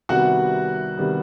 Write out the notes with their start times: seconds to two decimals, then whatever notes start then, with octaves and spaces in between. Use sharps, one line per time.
0.09 C2 C3 D#3 G3 B3 F#4 F#5
0.97 C3 D#3 G3 B3